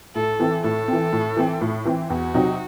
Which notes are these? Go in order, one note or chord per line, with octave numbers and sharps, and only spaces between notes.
A2 A4
E3 C4
A2 A4
E3 C4
A2
E3 C4
A2
E3 C4
E2 F#4
C3 F#3 C4 D#4